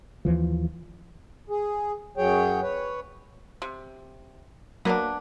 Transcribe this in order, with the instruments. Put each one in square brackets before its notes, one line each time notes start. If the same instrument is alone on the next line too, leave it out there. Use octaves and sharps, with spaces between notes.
[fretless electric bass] D#2 E3 F3
[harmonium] G#4
F#2 F#3 G#4 C#5 G5
B4 C#5
[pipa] C3
[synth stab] F#3 A#3 [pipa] B3 D4